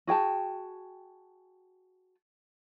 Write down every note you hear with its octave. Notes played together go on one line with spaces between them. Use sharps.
F#4 G#4 G5 A5